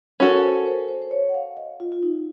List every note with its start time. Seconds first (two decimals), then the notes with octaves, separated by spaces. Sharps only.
0.20 C#4 F#4 A4 A#4
0.43 C5
0.59 A#4
0.66 C5
0.88 C5
1.02 C5
1.11 C#5
1.29 F#5
1.34 F5
1.57 D#5
1.80 F4
1.92 F4
2.03 D#4